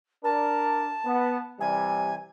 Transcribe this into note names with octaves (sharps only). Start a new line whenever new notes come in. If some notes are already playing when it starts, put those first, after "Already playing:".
D4 A#4 A5
B3
C3 E3 G3 G#5